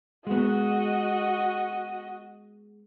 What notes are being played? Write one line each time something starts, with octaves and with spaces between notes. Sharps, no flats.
G#3 B3 F#4 D#5